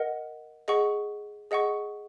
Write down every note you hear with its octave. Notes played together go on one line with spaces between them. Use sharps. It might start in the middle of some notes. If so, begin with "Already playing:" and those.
Already playing: A#4 D#5 F#5
G#4 D#5 F#5 C#6
G#4 D#5 F#5 C#6